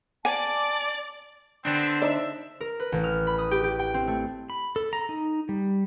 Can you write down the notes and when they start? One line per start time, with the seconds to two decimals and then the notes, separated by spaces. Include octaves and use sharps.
0.25 D5 G#5 A5 D6
1.65 D3 B3 C4 D4
2.02 D#4 C5 D5 E5
2.61 A#4
2.80 B4
2.92 A1
3.04 F6
3.27 B5
3.38 D#6
3.51 G4
3.64 G4
3.79 G5
3.94 C4
4.07 A3
4.50 B5
4.76 A4
4.93 A#5
5.09 D#4
5.49 G3